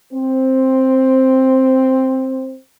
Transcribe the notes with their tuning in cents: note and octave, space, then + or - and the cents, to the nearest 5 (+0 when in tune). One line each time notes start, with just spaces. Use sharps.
C4 +5